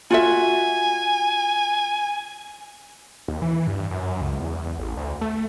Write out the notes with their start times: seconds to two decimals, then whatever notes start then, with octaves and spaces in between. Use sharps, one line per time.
0.11 F4 F#4 E5 G#5
3.28 D#2
3.42 E3
3.67 G2
3.91 F#2
4.21 C#2
4.40 E2
4.79 A1
4.97 D2
5.21 A3